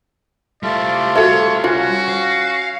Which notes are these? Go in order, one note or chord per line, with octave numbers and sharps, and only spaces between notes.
G3 A3 E4 F4 D5
F#4 A4 C#5 E5
C#4 F4 F#4
F5